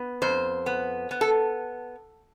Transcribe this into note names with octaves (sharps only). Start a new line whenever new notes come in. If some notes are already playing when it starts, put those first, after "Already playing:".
Already playing: B3
F2 C5
B3
B3
A4